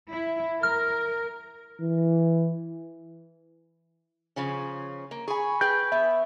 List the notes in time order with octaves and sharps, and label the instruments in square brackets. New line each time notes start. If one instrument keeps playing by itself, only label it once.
[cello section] E4
[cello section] A#4 [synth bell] F6
[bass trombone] E3
[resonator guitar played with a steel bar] C#3 F3 C#4
A#3
[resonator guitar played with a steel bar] G#4 G#5 [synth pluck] B5 C#6
[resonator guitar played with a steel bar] G#4 B4 G5 [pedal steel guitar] G6
[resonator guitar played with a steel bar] B3 [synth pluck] E5